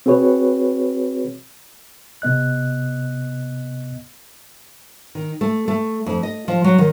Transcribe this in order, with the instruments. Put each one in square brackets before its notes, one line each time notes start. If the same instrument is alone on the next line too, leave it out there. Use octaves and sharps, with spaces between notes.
[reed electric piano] C4 F#4 G#4 B4 C#5
[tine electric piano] C3 B3 D#5 F#6
[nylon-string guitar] D#3
A3
A3
F2
D#5
F3
F#3
D#3